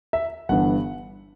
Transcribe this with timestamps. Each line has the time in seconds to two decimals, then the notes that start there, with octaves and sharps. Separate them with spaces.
0.13 E5
0.49 G1 G2 E3 F#5